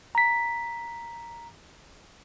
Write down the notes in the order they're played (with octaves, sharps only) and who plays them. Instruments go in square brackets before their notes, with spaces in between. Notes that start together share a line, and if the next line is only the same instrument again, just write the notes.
[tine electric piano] A#5 B6